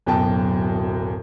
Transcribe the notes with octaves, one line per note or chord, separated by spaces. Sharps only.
D1 F#2 B2 G5 A5